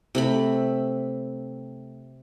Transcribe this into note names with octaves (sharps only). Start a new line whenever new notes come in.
C3 A3 B5